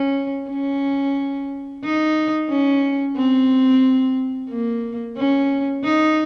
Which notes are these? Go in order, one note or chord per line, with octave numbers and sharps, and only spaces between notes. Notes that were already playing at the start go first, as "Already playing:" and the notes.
Already playing: C#4
C#4
D#4
C#4
C4
A#3
C#4
D#4